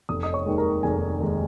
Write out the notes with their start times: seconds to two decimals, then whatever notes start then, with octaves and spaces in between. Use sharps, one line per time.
0.09 F1 D#6
0.23 D#5 D#6
0.33 C#5 C#6
0.46 D#2 D#3 G#3
0.58 A#4 A#5
0.83 F1 G#4 G#5
1.20 D#2 D#3 G#3